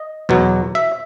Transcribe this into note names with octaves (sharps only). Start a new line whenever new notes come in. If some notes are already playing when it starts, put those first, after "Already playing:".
Already playing: D#5
E2 B2 F#3
E5